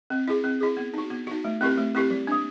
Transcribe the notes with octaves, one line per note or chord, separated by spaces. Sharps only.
C4
E4 G#4
C4
E4 G#4
B3
D#4 F#4
B3
D#4 F#4
A3
C4 E4 G4 A#4
A3
C4 E4 G4 A#4
G3
A#3 D4